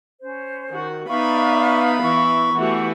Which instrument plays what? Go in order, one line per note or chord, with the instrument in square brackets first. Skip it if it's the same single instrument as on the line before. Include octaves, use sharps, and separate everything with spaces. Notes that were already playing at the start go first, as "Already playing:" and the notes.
[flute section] C#4 C5
[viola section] D#3 F#4
[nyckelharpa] B3 B5 [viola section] D#4 B4 D5 [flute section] E5 F5 [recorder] C#6
[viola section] E3 E4 [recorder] C#6
[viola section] E3 A3 F#4 [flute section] G4 F#5